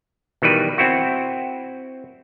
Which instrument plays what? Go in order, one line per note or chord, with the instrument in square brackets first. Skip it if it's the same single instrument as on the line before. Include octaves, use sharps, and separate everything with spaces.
[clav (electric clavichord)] B2 D#3 E3 G3 B4
C4 E4 F#4